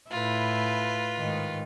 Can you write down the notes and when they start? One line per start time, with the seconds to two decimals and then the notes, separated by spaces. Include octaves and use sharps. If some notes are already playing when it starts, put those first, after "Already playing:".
0.11 A2 E4 F4 B4
1.18 G#2 D#3